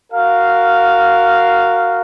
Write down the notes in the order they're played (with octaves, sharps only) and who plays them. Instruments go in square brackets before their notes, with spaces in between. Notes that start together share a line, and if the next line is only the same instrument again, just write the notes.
[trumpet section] F#4 A#4 F5